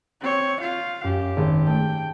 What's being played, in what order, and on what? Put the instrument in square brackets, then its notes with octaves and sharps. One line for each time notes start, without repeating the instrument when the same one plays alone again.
[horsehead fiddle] C4 C#5
[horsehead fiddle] F4 F5 [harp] G6
[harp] F#2 [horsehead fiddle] G4
[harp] G#1
[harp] A3 [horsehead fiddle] G5